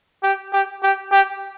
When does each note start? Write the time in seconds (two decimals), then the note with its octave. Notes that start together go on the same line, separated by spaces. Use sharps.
0.23 G4
0.53 G4
0.83 G4
1.12 G4